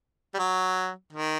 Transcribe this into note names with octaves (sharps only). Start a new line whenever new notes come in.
G3
F#3
D#3